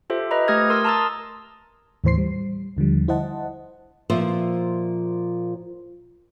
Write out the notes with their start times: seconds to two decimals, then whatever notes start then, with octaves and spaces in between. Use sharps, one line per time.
0.10 F4 G4 A4 C5 E5
0.31 B4 D#5 A#5 B5
0.48 A3 G4 D#6 F6 G#6 A#6
0.70 A#4 C6 E6 A#6
0.85 A5 A#5 C6 D#6 E6 A6
2.04 D#2 A2 E3 C5 C6 C7
2.18 G3
2.77 D#2 D3 F3 G3
3.08 E4 C5 D#5 F#5 A5
4.10 A#2 F3 C5 E5